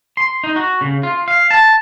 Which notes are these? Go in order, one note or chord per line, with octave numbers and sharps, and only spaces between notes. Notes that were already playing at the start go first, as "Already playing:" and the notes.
C6
D#4
F#4
C#3
F4
F5
A5